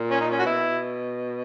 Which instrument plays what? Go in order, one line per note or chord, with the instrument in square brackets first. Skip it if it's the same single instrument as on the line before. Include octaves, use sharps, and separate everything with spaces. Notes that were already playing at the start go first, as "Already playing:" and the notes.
Already playing: [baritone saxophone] A#2
[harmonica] C#4
D#4
C#4
F#4
[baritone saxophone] B2 [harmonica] E4